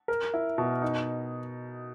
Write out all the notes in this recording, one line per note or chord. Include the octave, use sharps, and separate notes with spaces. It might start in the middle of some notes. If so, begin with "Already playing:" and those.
A#4
E4
B2
D#4